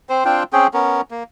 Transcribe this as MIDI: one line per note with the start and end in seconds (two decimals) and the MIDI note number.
0.09 0.24 60
0.09 0.24 72
0.25 0.43 60
0.25 0.43 62
0.25 0.43 65
0.25 0.43 79
0.53 0.67 60
0.53 0.67 61
0.53 0.67 68
0.53 0.67 79
0.74 1.01 59
0.74 1.01 61
0.74 1.01 70
1.11 1.23 58